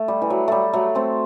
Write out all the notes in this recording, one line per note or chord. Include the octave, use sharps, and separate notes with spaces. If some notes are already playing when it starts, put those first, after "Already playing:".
Already playing: A3
G3
E3
F#3
G3 A3
F#3 A3
A3 C4